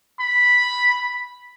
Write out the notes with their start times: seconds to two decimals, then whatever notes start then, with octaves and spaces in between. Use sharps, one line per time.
0.20 B5